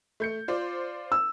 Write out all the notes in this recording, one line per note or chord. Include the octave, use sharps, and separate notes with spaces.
A3 G6 C#7
F4 C5 D5
E6